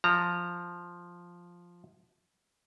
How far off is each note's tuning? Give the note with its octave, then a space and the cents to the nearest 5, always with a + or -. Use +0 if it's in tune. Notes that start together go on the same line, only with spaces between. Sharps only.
F3 +0 A#5 -20